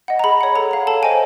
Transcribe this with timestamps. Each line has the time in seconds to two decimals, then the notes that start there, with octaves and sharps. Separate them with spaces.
0.08 D#5 F#5
0.19 A#5
0.24 G#4 B5
0.41 C#5 F#5
0.56 A4 A#5
0.71 C#5 F5
0.87 A4 A5
1.03 C5 D#5 G5 G#5